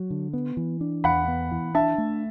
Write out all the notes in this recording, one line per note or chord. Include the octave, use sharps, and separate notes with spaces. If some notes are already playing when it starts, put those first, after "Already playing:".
Already playing: F#3
D3
B3
E3
D4
E2 F#5 B5
B3
E3
D4 E5 A5
A3